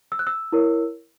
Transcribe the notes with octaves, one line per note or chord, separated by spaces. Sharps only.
E6
F#6
E6
E4 A#4 C#5